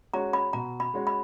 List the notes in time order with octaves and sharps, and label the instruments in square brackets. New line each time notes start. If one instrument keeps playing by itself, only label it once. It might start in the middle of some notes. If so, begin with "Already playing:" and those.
[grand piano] G#3 C#4 F#4 C#5 [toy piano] A#5
[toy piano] B5
[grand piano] B2 [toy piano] A#5
[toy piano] B5
[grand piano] G#3 C#4 F#4 C#5
[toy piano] B5